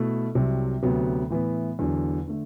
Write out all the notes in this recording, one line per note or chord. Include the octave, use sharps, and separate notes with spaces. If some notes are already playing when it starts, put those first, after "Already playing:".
Already playing: B2 A3 E4 A4
C2 C3 F#3
D2 C3 F#3 B3
A2 E3 B3
E2 D3 F#3
D3 A3